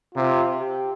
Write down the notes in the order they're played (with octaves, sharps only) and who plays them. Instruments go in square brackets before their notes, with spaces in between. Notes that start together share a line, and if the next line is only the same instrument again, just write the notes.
[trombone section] C3 [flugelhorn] F4
[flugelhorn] G4